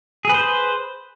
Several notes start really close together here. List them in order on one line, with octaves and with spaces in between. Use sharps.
G#4 B4 C5